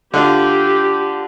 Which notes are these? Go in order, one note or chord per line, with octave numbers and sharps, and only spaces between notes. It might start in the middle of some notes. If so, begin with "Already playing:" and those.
D3 F4 G4